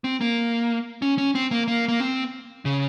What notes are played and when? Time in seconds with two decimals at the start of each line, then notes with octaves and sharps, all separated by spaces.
0.04 C4
0.21 A#3
1.02 C#4
1.18 C#4
1.35 C4
1.51 A#3
1.68 A#3
1.88 A#3
2.00 C4
2.65 C#3